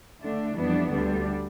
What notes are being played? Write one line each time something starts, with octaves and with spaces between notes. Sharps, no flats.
D3 A3 D4
F2 E3 G3 B3 D4
D2 D3 G3 D4